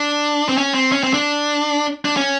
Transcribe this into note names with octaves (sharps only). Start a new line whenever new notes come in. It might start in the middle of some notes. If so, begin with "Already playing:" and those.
Already playing: D4
C4
C#4
C4
C#4
C4
D4
D4
C#4